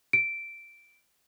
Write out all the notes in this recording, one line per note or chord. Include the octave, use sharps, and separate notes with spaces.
D7